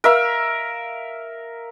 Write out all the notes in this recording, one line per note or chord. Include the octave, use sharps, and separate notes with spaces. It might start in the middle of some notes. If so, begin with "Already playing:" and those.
A#4 E5 F5